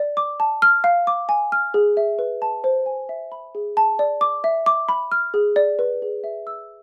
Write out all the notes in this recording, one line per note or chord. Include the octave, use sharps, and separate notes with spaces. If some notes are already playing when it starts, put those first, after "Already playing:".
Already playing: D5
D6
A5
F6
F5
D6
G#5
F6
G#4
E5
B4
A5
C5
G#5
E5
B5
G#4
A5
D5
D6
E5
D6
B5
F6
G#4
D5
B4
G#4
E5
E6